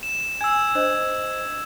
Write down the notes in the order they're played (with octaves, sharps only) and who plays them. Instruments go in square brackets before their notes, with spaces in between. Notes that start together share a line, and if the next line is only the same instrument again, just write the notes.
[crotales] E7
[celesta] G#5 [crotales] E6 G#6
[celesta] D4 C5 D#5